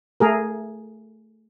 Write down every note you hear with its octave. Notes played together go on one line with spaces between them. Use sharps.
A3 G#4 A#4